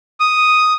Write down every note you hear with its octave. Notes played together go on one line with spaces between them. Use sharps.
D#6